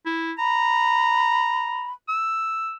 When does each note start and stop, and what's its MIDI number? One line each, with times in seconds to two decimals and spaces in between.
0.06 0.33 64
0.38 1.89 82
0.38 1.92 83
2.09 2.76 88